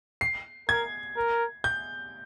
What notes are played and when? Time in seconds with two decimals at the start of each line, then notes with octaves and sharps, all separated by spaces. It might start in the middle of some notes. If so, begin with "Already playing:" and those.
0.21 C7
0.69 A#4 G#6
1.17 A#4
1.64 G6